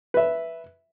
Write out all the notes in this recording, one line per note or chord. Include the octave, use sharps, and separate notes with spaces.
B4 E5